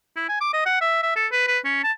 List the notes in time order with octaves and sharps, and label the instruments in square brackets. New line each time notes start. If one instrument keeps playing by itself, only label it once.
[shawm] E4
G#5
D6
D#5
F#5
E5
E5
A4
B4
B4
C#4
A5